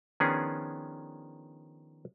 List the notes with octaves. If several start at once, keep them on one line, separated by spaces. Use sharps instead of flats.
D#3 F3 B3 C#4 D4 G#4